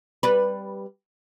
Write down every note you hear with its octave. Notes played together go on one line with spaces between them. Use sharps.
G3 B4